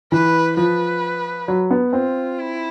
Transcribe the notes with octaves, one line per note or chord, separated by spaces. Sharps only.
E3 B4
F3 B4
F#3
B3
C4 F4
E4